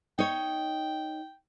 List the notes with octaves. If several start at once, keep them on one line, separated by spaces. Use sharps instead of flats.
D#4 C#5 G5